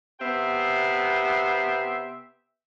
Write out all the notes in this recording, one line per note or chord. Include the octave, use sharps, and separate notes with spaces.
C3 B3 E5 G5 C6